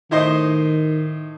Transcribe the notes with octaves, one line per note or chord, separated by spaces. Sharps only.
A2 D#3 C5 D#5